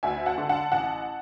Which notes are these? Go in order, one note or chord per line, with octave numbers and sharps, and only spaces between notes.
D2 E5 G#5
F#5 A5
D3
F#5 A5
A1 F#5 A5